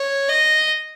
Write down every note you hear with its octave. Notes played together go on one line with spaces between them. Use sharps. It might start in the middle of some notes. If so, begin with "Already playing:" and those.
Already playing: C#5
D#5